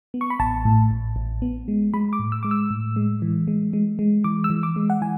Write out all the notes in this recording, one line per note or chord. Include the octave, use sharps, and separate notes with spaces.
B3
C#6
B5
A1 A5
A2
A1
A1
B3
G#3
G#3 B5
D6
A2
E6
G#3 D6
E6
A2
G#3
E3
G#3
G#3
G#3
E3 D6
E6
E3
D6
G#3
F#5
E3 G#5